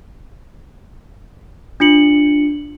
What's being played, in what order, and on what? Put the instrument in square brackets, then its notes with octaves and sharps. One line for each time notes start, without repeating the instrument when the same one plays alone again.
[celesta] D4 F4 C#7 F#7